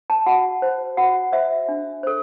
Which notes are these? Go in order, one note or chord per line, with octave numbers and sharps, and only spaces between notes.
A5
F#4 F#5
C5
F#4 F#5
C5 E5
D4
A4 C5